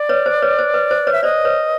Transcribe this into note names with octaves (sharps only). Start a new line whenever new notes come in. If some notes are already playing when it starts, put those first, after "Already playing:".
Already playing: D5
B4 C#5
C5
B4 C#5
C5
B4
C5
B4 C#5
E5
C5 D5 D#5
B4 C#5